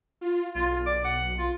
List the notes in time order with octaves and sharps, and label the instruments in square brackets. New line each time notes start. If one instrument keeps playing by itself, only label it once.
[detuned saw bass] F4
[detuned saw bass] B1 [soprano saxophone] F4
[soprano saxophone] D5
F#5
F4